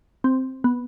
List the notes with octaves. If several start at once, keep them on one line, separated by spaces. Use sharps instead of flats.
C4
B3